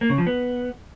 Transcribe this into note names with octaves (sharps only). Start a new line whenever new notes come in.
A#3
C#3
F3
B3